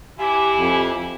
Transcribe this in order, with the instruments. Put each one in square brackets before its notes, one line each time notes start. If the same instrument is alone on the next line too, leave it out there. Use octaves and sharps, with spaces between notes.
[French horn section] E3 E4 [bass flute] G4 [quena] G#5
[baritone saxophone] F2